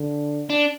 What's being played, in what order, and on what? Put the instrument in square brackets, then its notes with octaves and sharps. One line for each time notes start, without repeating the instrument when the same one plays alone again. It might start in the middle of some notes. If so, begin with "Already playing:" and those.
Already playing: [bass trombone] D3
[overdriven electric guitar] D4